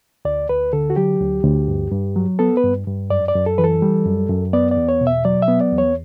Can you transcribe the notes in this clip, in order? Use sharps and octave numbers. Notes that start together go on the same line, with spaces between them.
D2 D5
D2 B4
D3 A4
F#4
F#3 G4
D2
D2
G2
G2
F#3
B3 A4
B4
G2
G2
F#2 D5
D5
F#2
A4
E3 B4
A4
G3
F#2
F#2
B3 D5
D5
E2
C#5
B2
E5
F#3 D5
E5
B3
D5
E2
C#5